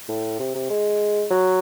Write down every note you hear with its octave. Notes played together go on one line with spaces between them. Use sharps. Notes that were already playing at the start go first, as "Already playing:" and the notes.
A2
C3
C3
G#3
F#3